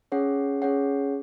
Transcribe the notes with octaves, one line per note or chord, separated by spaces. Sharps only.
C#4 G#4 C#5 F#5
C#4 G#4 C#5 F#5